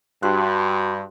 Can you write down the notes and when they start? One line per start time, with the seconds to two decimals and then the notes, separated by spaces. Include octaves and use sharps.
0.23 G2 F#4 C6 F#6